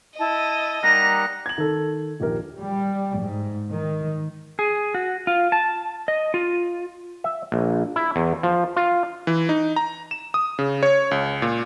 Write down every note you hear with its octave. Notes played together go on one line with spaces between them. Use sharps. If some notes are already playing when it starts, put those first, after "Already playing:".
E4 D#5 A5
G3 A#3 D#4 F#5 A#5 F#6 A#6
G#6 F#7
D#3 A4
A#1 D#2 G4 A#4
G3
G#2
D#3
G#4
F#4
F4
A5
D#5
F4
E5
A#1
E4
E2
F3
F4
E3
D#4
A#5
E7
D#6
C#3
C#5
C#2
A#2